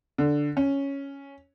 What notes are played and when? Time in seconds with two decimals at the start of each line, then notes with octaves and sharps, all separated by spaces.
0.18 D3
0.57 C#4